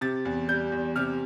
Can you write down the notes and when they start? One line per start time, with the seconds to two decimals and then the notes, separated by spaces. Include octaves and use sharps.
0.01 C3 A6
0.25 E2
0.49 G3 G6
0.72 E2
0.96 C3 F6